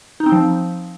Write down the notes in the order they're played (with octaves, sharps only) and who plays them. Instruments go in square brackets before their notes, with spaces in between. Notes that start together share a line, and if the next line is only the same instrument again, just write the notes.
[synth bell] D#4
C4
F3